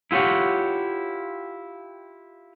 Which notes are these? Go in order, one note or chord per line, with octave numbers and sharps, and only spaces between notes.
E4 F4 G4 C#5 F#5